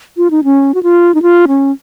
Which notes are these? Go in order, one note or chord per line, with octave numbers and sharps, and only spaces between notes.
F4
D#4
C#4
F#4
F4
D#4
F4
C#4